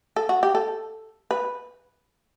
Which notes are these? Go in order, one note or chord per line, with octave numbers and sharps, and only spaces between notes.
A4
F#4
G4
A4
B4